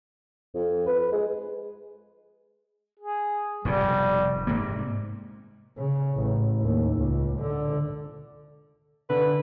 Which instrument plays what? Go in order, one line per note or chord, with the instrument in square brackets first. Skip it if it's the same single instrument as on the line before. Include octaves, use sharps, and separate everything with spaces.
[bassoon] F2
B4
G#3
[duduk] G#4
[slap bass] F1 G#2 B2 [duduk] G3
[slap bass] G#2 C3 A#3
[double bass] C#3
A1
D#2
C#2
D3
[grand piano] D3 [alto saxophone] B4